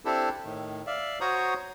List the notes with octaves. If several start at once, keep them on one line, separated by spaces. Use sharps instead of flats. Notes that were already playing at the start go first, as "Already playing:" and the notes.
C4 D4 E4 G4 A4
A2 D#3
D5 E5 F5
F#4 C5 C#5 A#5 C#6 D#6